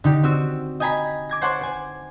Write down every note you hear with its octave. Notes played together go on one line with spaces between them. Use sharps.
D3 D#4 G4
C4 F#4 E6
D#5 G5 G#5 A#5 B5 B6
D6 G#6 A#6
C5 C#5 F#5 A5 C6 D6
C5 G#5